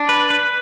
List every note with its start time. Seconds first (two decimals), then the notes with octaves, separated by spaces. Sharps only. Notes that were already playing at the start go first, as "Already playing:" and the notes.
Already playing: D4
0.09 B4
0.30 B4